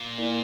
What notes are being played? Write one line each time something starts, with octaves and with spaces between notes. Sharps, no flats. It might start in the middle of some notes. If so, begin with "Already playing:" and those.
Already playing: A#2
A#3 E4 A#4 D5